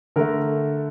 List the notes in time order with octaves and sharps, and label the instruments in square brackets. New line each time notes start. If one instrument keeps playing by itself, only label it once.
[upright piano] D3 A3 A#4